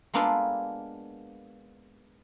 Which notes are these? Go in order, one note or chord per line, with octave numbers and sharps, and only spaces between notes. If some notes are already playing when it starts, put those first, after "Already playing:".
G#3 A#3 B3 D4 F4 A4